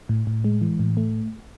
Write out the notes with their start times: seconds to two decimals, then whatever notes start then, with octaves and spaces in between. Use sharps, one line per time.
0.09 A2
0.27 A2
0.44 G#3
0.61 E3
0.79 A2
0.97 A3